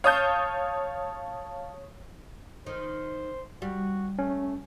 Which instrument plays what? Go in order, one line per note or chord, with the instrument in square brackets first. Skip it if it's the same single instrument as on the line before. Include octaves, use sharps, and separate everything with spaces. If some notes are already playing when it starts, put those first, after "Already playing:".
[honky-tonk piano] C#5 D#6 G6 [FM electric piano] F5 A5
[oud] D#3 [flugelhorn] C5
[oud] G3 [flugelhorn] F#4
[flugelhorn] A3 [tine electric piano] C#4